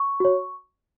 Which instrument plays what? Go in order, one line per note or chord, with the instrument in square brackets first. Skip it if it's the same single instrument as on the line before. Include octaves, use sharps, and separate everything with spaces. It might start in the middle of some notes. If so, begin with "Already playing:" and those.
Already playing: [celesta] C#6
F#4 C#5